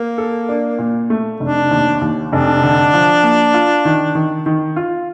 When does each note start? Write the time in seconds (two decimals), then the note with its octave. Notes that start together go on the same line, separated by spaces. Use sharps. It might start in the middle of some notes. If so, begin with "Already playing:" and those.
Already playing: A#3
0.18 A4
0.49 D4
0.79 A#2
1.10 A3
1.40 F1 D4
1.71 D#2
2.01 D#2
2.32 F1 D4
2.63 D3
2.94 F3
3.23 A#3
3.54 F4
3.85 D#3
4.15 D#3
4.46 D#3
4.76 F4